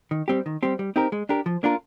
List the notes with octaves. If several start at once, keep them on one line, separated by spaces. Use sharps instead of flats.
D#3
G3 C4 G4
D#3
G3 C4 G4
G3
C4 D#4 G4 A#4
G#3
D4 G4 A#4
F3
A#3 D4 F4 A#4